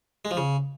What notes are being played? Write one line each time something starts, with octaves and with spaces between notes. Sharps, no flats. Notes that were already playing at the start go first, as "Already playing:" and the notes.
G#3
F3
C#3